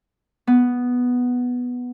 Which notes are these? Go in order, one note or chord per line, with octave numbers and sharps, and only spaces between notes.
B3